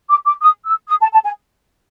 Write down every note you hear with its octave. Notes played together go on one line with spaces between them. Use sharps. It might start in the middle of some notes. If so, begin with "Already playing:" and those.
D6
D6
D#6
E6
D#6
A5
A5
G#5